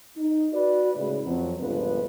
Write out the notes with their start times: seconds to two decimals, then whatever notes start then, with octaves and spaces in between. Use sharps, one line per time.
0.17 D#4
0.53 F#4 B4 D5
0.96 C#2 A2 B4
1.24 F2 F#3
1.59 G1 C#2 A#2 D3 F3 B4